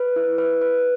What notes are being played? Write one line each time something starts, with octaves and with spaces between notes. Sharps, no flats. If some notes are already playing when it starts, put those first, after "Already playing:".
Already playing: B4
E4
B4
B4